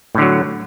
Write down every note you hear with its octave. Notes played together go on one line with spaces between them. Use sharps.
A2 D3 F#3